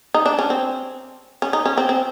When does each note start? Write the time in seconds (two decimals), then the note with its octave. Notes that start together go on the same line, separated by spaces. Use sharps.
0.14 D#4
0.26 D4
0.39 C#4
0.50 C4
1.42 C#4
1.53 D#4
1.66 C#4
1.78 C4
1.89 C4